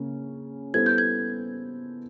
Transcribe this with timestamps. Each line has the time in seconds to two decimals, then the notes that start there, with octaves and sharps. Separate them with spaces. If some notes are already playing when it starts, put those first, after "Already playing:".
Already playing: C#3 A#3 C#4
0.74 G3 B3 E4 A4 C5 G#6
0.86 G6
0.98 G#6